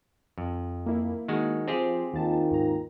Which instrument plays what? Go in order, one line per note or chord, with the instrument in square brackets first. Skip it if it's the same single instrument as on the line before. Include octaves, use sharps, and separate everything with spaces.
[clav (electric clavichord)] F2
[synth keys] A#3 E4
[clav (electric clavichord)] D#3 G#3 F#4
[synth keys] F3 F4 C5 [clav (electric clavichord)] C4 G4 G#4
[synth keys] D#2 A5 [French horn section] D#3 F4
[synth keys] D#2 G#2 A#5